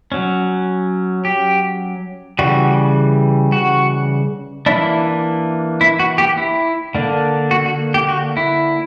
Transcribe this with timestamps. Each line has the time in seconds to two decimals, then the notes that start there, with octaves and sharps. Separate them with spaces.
0.12 F#3 C#4
1.25 G4
2.39 C#3 E3 G3 F#4
3.52 F#4
4.66 E3 A#3 D4 E4
5.81 E4
5.99 F#4
6.18 G4
6.38 E4
6.95 D3 A#3 D4
7.51 F#4
7.66 F#4
7.94 G4
8.09 F#4
8.37 E4